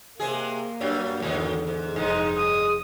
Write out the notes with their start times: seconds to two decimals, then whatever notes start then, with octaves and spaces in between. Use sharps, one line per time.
0.20 C3 G#3 A#3 G#4
0.81 F#2 F#3 G3
1.22 E2 G2 D3 D#3 F#3
1.67 G#2
1.96 F1 G2 G#3 D#4
2.37 D#6